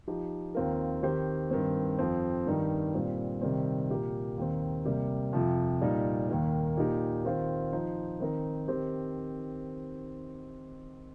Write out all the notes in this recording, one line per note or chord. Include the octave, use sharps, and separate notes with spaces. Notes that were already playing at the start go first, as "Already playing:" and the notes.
F3 D#4 G4
D#2 D#3 C4 F4 A#4
D#3 C4 G4 C5
G2 D#3 C4
F2 F3 C4
G2 D#3 G3 D#4
A#2 G3 C4
C3 D#3 G3 C4
A#2 A#3 G4 A#4
D#2 D#3 C4
C3 G3 A#3 G4
F2 C3 F3
A#2 G3 D#4
D#2 D#3 A#3
A#2 A#3 D#4 G4
D#3 C4 F4 C5
F3 D#4 C5
D#3 C4 D#4 A#4
D#3 C4 G4 C5